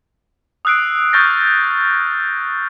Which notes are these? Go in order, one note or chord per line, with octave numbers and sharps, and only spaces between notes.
D#6 E6 F#6 C7 D7
C#6 D#6 F6 G6 A6 A#6